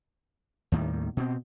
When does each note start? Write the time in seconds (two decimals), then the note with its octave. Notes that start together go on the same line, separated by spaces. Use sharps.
0.72 D#2 A2 D#3 G3
1.17 B2 C4